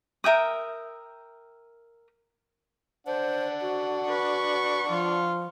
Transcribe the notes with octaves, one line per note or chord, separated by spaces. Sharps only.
A#4 E5 G5 D#6
D4 C5 F#5
F#4
B4 C#6
F3 F4